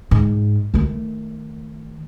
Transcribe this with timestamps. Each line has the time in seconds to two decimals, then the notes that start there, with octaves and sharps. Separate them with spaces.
0.11 G#2
0.74 D#3 A3